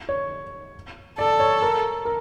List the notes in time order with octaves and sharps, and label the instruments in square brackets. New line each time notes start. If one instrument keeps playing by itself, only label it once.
[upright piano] C#5
[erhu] A4 [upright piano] D5
[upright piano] C#5
A#4
A#4